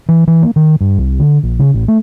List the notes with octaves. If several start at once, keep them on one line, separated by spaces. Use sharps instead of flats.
E3
E3
A#3
D#3
G2
C2
D3
A#1
C#3
A1
A3